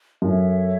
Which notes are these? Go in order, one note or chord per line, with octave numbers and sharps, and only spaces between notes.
F#2 A4 C#5 E5